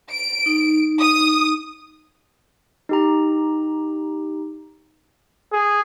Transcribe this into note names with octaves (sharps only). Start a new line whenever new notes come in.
D7
D#4
D#6
D#4 G4 A#5
G#4